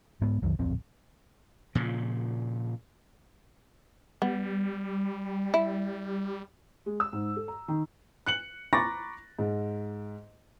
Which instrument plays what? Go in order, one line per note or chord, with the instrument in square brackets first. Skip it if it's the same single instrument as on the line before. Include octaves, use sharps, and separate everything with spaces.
[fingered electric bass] G#2 G#3 B3
C2 F#2 D#3 E3
D1 A#1 F2 C4
[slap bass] A#2 C#3 F3
[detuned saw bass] G3 [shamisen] B3
[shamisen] E4
[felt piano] G#3
E6
G#2
A4
A#5
D#3
[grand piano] F#6 C#7 F#7
A#5 B5 C#6 D6 A6 A#6
G#2